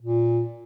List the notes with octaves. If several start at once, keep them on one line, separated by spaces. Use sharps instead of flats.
A#2